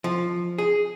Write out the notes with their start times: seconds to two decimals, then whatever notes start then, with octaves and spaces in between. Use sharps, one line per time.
0.04 F3
0.58 G#4